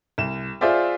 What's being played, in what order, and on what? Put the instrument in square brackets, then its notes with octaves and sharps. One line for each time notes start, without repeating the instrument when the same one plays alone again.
[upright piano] C2 E7
F4 G#4 C5 D5 E5